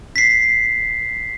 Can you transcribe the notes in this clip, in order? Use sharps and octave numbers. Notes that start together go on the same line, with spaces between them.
B6 C7